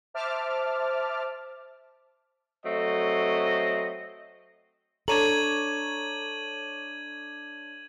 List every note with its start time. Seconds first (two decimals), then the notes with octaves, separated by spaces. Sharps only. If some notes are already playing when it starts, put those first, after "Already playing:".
0.14 C5 E5 A5 D6 F6
2.64 F#3 A3 C4 D#5
5.08 D4 A4 C#5 A#5 G#6 D#7 F#7